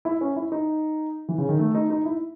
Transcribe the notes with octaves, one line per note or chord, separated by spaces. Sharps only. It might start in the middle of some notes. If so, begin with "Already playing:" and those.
E4
C#4
E4
D#4
E3
C#3
D#3
A3
D#4
D#4
E4